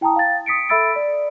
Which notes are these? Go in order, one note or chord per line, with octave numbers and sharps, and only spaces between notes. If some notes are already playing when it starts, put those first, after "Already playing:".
E4 G5 A5 A#5 D#6
F5 G5 A6
D#6 B6 C#7 D7
A4 E5 B5 E6 A6 D7
D5